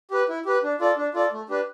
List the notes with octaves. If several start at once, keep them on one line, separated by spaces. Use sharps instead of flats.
G4 B4
E4
G4 B4
D4
F4 A4 D5
D4
F4 A4 D5
A3
D4 G4 B4